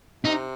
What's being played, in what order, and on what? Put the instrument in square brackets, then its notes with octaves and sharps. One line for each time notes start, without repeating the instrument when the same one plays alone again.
[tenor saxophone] C3 [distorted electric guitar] D#4